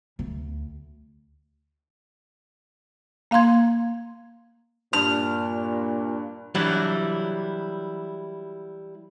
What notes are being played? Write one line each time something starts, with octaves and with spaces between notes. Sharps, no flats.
D2
A#3 F5 A#5 C6 G#6
G2 A#2 A5 F6
E3 F#3 G3 D4 E4